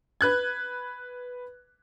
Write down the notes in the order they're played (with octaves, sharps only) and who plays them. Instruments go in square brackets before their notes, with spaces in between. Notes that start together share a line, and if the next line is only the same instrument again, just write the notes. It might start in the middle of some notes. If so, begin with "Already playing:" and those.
[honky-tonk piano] B4 F#6 G#6